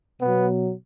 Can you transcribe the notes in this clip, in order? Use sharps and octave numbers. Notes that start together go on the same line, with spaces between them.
B2 F#3 B3